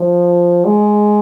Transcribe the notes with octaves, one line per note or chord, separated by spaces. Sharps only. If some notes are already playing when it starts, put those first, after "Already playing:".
Already playing: F3
G#3